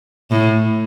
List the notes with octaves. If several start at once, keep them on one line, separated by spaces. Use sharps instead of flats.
A2